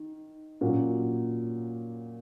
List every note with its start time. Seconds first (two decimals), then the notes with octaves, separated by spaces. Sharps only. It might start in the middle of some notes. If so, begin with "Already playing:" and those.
Already playing: D#3
0.61 A#2 F#3 A#3 C#4 F#4